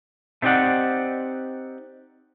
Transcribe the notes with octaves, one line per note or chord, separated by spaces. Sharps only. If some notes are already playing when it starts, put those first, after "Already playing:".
A3 C4 D#4 G4 D5 F#5